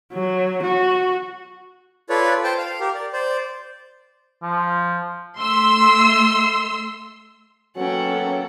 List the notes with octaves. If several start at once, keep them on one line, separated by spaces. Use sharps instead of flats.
F#3
F#4
F4 A4 B4 C#5 D5
C5 G5 A5
F5
G4 A#4
D5
C5 D5
F3
A3 C6 E6
F#3 A#3 B3 C#4 F#4 A4 F#5 G5